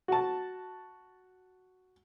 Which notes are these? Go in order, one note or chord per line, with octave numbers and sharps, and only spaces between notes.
F#4 A5